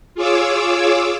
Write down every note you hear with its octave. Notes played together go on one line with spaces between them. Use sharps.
F4 G#4 C#5 D6 E6